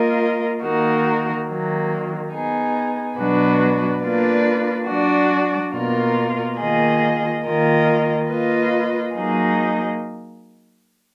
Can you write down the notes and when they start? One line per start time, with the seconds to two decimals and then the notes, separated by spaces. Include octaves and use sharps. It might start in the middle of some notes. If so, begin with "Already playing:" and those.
Already playing: A#3 F4 A#4 D#5
0.62 D#3 A#3 D#4 F#4 A#4
1.48 D#3 F#3 A#3
2.33 B3 D#4 G#4
3.18 B2 F#3 D4 F#4 B4
4.03 A#3 D4 F4 B4 D5
4.89 F#3 D4 F#4 D5
5.74 B2 A#3 F4 A#4
6.60 D#3 A#3 F4 G#4 D#5
7.45 D#3 A#3 F4 A#4 D#5
8.31 A#3 F4 B4 D#5
9.16 F#3 A#3 D#4 G#4 D#5